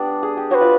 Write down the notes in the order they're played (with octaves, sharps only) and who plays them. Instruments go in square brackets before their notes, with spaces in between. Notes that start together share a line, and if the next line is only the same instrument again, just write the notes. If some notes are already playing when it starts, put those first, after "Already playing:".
Already playing: [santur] G3 B3 D4
G#4
G4
[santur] F#4 [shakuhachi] B4 C#5
[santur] F4